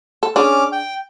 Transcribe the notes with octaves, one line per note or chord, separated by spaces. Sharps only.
A4
C#4 D4 G#4 D6 F6
G5